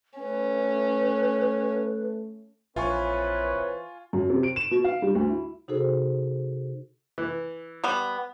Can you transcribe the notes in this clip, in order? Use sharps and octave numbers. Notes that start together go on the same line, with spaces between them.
A3 C#4 B4
A#1 E3 C4 F4 B4 C#5 G#5 C#6
F#2
C3
D7
E7
B2
F5
G3
D2
E4
C3 D#4 F#4 G#4 A4 C5
E3
G3 B3